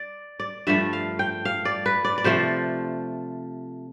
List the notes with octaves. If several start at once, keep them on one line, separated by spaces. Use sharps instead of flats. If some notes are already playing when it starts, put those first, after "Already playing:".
Already playing: D5
D5
G2 F3 A3 E5
F5
G5
F5
D5
B4
D5
D5
C3 F3 A3 C5